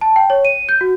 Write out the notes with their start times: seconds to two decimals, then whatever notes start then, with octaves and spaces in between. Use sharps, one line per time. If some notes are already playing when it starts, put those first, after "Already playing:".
0.01 A5
0.16 G5
0.30 C#5
0.45 D#7
0.69 G6
0.81 F#4